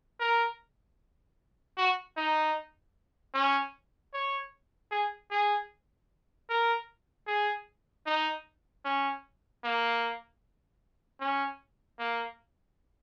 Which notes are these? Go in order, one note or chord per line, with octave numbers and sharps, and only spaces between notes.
A#4
F#4
D#4
C#4
C#5
G#4
G#4
A#4
G#4
D#4
C#4
A#3
C#4
A#3